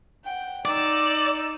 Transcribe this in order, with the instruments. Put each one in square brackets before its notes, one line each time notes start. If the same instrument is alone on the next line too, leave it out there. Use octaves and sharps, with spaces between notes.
[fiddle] F#5 G5
[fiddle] D#4 E6 [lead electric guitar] D5